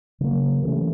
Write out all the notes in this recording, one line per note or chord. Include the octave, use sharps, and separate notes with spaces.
C#3 F#3 A#3
C3 E3 A3 C#4